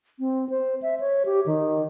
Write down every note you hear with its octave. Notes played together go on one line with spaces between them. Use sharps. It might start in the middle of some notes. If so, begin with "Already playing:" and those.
C4
C5
E5
C#5
G4
D#3